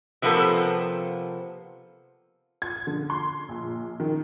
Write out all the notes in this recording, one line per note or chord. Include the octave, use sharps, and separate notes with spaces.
C3 F3 A#3 B3 A4
G#6
D3
C6
A#1
D#3